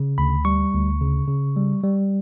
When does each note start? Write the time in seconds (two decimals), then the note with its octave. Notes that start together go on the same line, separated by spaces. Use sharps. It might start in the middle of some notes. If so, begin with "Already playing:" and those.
Already playing: C#3
0.18 D2 B5
0.45 G3 C#6
0.74 D2
1.01 C#3
1.28 C#3
1.57 G3
1.84 G3